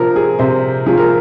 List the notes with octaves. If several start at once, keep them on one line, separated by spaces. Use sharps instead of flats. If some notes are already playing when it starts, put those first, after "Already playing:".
Already playing: C3 F3 A#4
G#4
C3 C5
F3 G#4
A#4